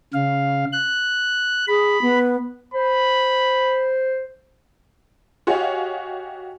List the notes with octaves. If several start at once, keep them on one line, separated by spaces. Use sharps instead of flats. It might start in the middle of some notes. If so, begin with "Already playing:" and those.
C#3 F5
F#6
G#4 B5
B3
C5 B5
F#4 G4 C#5 D#5 F5 G#5